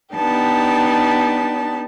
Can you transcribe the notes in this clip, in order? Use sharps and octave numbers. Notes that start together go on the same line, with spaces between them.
B3 D4 D#4 G4 A5